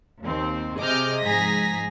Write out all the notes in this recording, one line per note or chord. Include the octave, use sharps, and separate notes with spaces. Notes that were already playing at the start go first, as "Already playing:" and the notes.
D#2 C4
C3 G#4 D#5 D6 F6 G6
G#2 F3 G#4 A#5 A#6 B6